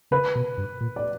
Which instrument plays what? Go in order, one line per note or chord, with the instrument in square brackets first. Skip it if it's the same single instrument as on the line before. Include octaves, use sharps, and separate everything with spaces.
[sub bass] C#3 [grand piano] B4
[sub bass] B2
G2
A#2
[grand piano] D5